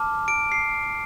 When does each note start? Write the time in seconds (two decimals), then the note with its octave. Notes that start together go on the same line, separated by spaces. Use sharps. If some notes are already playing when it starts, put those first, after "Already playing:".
Already playing: A5 D6 F6
0.28 D7
0.52 C7